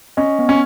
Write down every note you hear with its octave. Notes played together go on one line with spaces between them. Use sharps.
C#4 D#5
B3
C#4